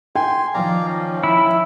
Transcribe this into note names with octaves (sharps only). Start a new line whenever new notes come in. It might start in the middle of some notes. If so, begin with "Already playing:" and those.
G5 G#5 C6
D#3 F3 D5 F5 A#5
C#4
E4